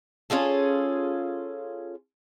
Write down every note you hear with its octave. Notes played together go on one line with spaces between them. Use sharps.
C#4 F4 G#4 A4